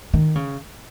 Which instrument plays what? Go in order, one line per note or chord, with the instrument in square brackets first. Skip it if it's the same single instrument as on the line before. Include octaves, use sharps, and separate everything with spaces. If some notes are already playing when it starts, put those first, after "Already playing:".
[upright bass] D#3
C#3